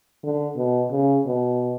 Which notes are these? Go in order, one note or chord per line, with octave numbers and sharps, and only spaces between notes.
D3
B2
C#3
B2